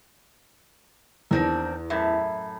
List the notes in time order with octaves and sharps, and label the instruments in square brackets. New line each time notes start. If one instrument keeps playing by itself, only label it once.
[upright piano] E2 [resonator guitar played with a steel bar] D#3 C4 D4
[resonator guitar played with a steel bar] F#2 A2 E5